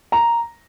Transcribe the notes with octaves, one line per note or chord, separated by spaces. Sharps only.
A#5